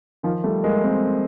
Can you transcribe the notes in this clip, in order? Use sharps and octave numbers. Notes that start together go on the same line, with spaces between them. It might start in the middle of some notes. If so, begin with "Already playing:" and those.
D#3 F3
G3 A3
G#3 A#3
A#3 C4